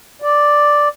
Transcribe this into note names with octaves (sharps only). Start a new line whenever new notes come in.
D5